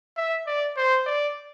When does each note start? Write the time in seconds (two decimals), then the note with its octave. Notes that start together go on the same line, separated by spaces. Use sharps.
0.17 E5
0.47 D5
0.77 C5
1.06 D5